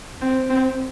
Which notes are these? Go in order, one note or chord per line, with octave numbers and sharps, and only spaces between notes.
C4
C4